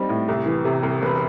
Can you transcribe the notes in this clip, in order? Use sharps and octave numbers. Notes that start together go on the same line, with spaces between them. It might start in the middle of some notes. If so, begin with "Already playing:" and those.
Already playing: G3 C4 D#4
A2
C2
E3
C3
C2
E1 B4